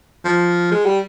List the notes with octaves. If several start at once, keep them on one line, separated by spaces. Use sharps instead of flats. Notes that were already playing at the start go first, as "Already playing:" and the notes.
F3
G#3
G3